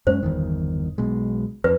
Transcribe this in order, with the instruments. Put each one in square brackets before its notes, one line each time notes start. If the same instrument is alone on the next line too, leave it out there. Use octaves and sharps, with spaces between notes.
[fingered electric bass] F#2 G#3 C#4 [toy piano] C5
[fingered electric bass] G1 E2 D#3
B1 B2 G#3
[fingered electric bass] F2 [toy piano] B4